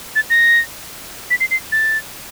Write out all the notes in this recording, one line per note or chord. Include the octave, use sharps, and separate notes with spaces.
A6
A#6
B6
C7
C7
A6